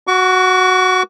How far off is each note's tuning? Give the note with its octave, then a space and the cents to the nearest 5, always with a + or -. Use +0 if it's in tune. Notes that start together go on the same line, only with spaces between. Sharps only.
F#4 -5 C#6 +40